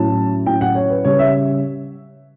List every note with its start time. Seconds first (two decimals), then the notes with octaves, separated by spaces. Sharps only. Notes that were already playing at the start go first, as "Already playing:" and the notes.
Already playing: A2 F#3 C#4 A5
0.46 A2 F#3 C#4 G5
0.61 F#5
0.75 C#5
0.90 B4
1.05 C#3 G3 C#4 C#5
1.19 E5